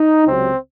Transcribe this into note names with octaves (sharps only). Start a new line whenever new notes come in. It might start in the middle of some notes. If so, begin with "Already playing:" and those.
Already playing: D#4
C#2 C3 F#3 C4